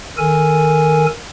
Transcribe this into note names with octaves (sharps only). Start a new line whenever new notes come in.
D#3 A4 A#4 G#5